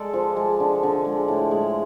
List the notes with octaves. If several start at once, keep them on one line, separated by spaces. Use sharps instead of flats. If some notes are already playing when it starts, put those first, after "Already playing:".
Already playing: G#3 A4 D5
F3
G#3
D3
D3
G#3
A2
G#3